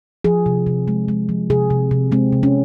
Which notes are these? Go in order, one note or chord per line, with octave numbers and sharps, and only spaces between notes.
F3 G#4
C3
C3
G#3
G#3
F3
C3 G#4
C3
C3
G#3 C4
C3
C#4